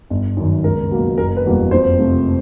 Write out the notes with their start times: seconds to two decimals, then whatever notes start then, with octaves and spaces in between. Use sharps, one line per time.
0.10 G1
0.37 F#2 D#3
0.64 C#2 A#4
0.91 B2 F#3 A#3
1.18 F#1 A#4
1.37 B4
1.46 E2 B2 G3 A#3
1.71 F2 C5
1.99 C3 F3 A3